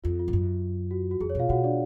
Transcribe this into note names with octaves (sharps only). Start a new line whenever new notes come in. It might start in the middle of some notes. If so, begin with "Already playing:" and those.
F2 F4
F4
G#2
F#2
F#4
F#4
F2 G#4
C#5
B2 F4 F5
B2 F#4 F#5
D4 D5